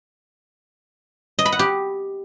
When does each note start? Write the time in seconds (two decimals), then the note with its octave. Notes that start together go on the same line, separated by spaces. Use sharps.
1.39 D#5
1.45 B5
1.52 F#5
1.59 G4